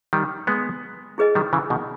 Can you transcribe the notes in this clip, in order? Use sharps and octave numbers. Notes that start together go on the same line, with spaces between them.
D#3 G3
G#3 B3
E4 G#4 B4 D#5 G#5
D#3 G3
C#3 E3
B2 D#3